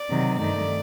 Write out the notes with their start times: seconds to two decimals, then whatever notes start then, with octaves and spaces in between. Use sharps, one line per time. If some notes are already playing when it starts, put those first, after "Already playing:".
Already playing: D5
0.10 C3 D#3 F#3
0.39 G2 D#3 A3 D5